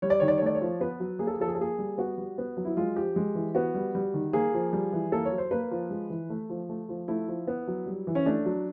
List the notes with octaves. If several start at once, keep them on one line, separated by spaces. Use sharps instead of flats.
G3 C#5
D5
D#3 C#5
D5
C#5
A3 D5
C#5
F3
B3 B4
F#3
A#3 G#4
A4
G#4
F3 A4
G#4
A4
A#3 G#4
G3
B3 F#4
G3
B3
F#3
E4
G#3 F4
F3 G4
G#3
E3
B3 F#4
G3
G3
D#3
A#3 G#4
F3
G3
E3
A#3 A4
C#5
F#3
C5
A#3 B4
F3
G#3
E3
A3
F3
A3
F3
A3 E4
F3
B3
F#3
G3
E3
C#4
A3 D4
F#3